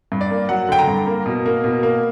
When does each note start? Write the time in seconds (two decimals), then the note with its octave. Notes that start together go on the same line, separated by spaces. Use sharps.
0.12 G2
0.21 D5
0.30 A#3
0.49 F#3 F#5
0.69 D3 G5
0.79 A#5
0.88 G2
1.07 A#3
1.26 B2
1.46 A#3
1.64 B2
1.83 A#3